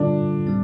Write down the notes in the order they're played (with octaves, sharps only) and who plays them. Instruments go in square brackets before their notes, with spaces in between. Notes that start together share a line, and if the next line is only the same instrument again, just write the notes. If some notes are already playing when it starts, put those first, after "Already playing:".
Already playing: [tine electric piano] D3 G3 F4 A4 [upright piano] D4
[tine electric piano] G3 C4